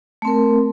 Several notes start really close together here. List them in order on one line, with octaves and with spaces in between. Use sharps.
A3 C4 A#4